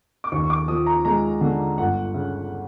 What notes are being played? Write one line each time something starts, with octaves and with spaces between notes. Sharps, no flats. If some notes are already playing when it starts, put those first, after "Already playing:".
D6
D#2 C#6
C#6
D6
F3 D#6
A#5
G#3 A#5
D3
G1 F#5
C#3